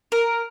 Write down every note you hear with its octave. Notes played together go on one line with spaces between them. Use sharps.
A#4